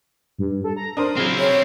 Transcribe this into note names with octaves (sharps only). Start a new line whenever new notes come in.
G2
A4
A#5
D4 A#4 C5 D#6
C#3 F#3 C4 E4 F6
C#5